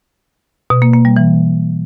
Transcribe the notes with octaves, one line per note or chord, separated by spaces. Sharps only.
B2
A#3
A#3
G3
E3